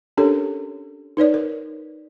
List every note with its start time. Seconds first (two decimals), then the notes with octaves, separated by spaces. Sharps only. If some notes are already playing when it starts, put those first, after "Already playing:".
0.17 C#4 D4 G4 A4 A#4 C#5
1.17 D#4 B4 C#5 D5
1.34 A#4